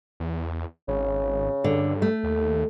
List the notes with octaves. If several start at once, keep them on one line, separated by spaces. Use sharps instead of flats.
E2
G#1 C#3
G2 D3
A3
D#2